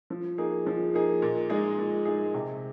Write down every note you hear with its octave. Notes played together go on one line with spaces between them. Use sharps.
F3
A#3 D#4 G#4
F3
A#3 D#4 G#4
A#2
G#3 D#4 G#4
A#2
G#3 D#4 G#4
C3